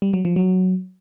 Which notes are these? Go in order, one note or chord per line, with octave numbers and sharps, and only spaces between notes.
G3
F#3
F3
F#3